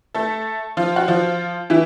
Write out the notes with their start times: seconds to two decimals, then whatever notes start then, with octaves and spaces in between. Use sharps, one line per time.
0.15 A3 A4
0.77 F3 F4
0.96 F#4
1.08 F3 F4
1.70 E3 E4